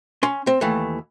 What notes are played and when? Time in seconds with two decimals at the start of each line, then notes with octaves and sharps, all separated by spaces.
0.23 C#4 C6
0.47 C4
0.61 D#2 E3 A3